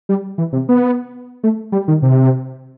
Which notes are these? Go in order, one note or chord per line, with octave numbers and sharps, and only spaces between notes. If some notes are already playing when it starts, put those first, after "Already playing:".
G3
E3
C3
B3
A3
G3
D#3
C3